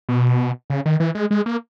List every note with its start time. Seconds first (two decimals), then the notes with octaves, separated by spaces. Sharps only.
0.09 B2
0.70 C#3
0.86 D#3
1.00 E3
1.15 G#3
1.31 G#3
1.46 A#3